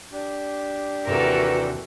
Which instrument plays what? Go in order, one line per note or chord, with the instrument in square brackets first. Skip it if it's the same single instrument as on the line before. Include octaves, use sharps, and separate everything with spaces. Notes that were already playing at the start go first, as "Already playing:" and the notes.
[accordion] D4 G4
[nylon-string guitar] D#2 G#2 C3 [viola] E3 [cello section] F#4 A4 A#4